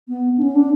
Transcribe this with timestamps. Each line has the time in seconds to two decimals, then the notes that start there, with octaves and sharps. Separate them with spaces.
0.09 B3
0.38 D4
0.43 C#4
0.55 D4